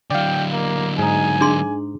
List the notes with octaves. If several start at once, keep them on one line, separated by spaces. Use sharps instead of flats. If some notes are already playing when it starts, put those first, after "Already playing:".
D3 F#3 D5 F5 G5
A#3
G#2 D#4 G#5
D4 G#4 C6